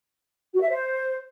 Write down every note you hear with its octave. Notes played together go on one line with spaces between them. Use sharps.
F#4
E5
C5